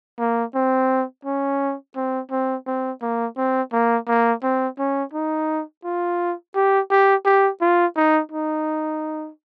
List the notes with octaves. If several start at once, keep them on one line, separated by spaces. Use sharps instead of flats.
A#3
C4
C#4
C4
C4
C4
A#3
C4
A#3
A#3
C4
C#4
D#4
F4
G4
G4
G4
F4
D#4
D#4